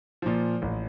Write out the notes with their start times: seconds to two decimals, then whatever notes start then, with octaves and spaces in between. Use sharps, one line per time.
0.22 A#2 F3
0.62 A1